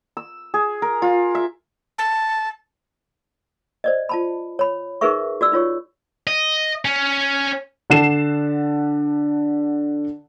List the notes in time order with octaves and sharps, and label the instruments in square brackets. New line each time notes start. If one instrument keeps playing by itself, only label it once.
[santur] E6
G#4
A#4
F4
E5
[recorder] A5
[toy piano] C5 D5 D#5
F4 A5 B5
C#5 B5
D#4 G#4 A#4 B4 E5 C#6
F#4 D5 E6
D#4 F4 C#5 C#6
[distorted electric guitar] D#5
C#4
[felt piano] D3 F#5 A5 C7 E7